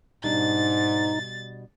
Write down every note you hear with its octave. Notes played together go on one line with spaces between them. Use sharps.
G#2 B2 G3 D4 D#4 A6